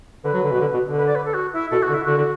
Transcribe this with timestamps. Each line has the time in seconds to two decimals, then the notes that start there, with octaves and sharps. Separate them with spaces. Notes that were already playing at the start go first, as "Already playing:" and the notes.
0.24 D3 B4
0.33 F#3
0.43 D3
0.51 B2
0.60 D3
0.74 B2
0.85 D3
0.97 B4
1.06 D5
1.15 B4
1.25 A4
1.34 F#4
1.53 E4
1.71 B2 A4
1.83 F#4
1.89 D3
1.94 E4
2.05 D3 F#4
2.17 D3